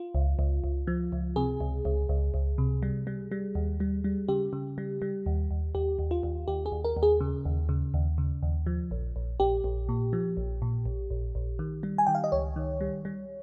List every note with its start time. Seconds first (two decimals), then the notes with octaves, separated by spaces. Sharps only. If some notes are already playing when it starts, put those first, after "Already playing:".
Already playing: F4
0.15 C#2
0.39 C#2
0.64 C#2
0.87 F3
1.12 C#2
1.36 C3 G#4
1.61 C#2
1.85 C#2
2.09 C#2
2.34 C#2
2.58 C3
2.83 G3
3.07 G3
3.32 G3
3.55 D#2
3.80 G3
4.04 G3
4.28 C#3 G4
4.53 C#3
4.78 G3
5.02 G3
5.26 D#2
5.51 D#2
5.75 D#2 G4
5.99 D#2
6.11 F4
6.23 D#2
6.48 D#2 G4
6.66 G#4
6.72 D#2
6.85 A#4
6.97 D#2
7.03 G#4
7.21 C#3
7.45 D#2
7.69 C#3
7.94 D#2
8.18 C#3
8.43 D#2
8.66 F3
8.91 A#1
9.16 A#1
9.40 A#1 G4
9.64 A#1
9.89 A#2
10.13 F3
10.37 A#1
10.62 A#2
10.86 A#1
11.10 A#1
11.35 A#1
11.59 D#3
11.83 G3
11.98 G#5
12.07 D#3 G5
12.15 F5
12.24 D#5
12.32 C#2 C#5
12.56 D#3
12.81 G3
13.05 G3